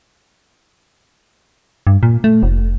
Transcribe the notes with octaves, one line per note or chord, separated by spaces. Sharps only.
G2
A#2
A3
F1